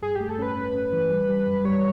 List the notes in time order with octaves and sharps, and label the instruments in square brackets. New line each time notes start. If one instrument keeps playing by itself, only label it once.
[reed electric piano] G2 [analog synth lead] G#4
[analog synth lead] G4
[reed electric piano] A3
[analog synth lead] A4
[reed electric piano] C#4 [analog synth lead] B4
[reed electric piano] C#4
C#4
E3
G3
G3
F#2
[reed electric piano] G3 [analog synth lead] C#5